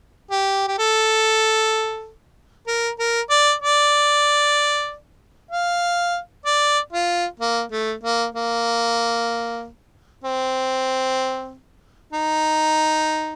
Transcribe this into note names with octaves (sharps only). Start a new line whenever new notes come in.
G4
G4
A4
A#4
A#4
D5
D5
F5
D5
F4
A#3
A3
A#3
A#3
C4
D#4